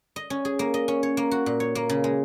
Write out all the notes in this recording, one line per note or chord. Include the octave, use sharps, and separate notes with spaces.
D#5
C#4
G#4
A#3
D#5
C#4
C#5
A#3
F#4
A#2
C#5
A#3
C#3
G#3